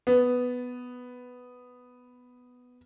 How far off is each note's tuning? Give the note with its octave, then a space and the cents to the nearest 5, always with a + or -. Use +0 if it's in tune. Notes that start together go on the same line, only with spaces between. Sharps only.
B3 +5